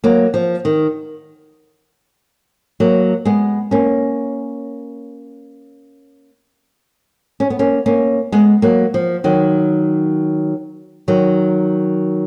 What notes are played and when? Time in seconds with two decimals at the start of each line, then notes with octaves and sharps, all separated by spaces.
0.04 F#3 A#3
0.34 F3
0.65 D#3
2.80 F#3 A#3
3.25 G#3 B3
3.71 A#3 C#4
7.40 C#4
7.50 B3
7.59 A#3 C#4
7.86 A#3 C#4
8.32 G#3 B3
8.62 F#3 A#3
8.94 F3
9.24 D#3 F#3
11.08 D#3 F#3